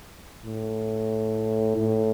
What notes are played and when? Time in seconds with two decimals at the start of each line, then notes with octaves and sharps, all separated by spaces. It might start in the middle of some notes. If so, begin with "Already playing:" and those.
0.45 A2
1.77 A2